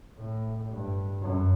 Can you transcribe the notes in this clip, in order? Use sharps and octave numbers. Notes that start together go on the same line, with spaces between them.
A2
G2
F#2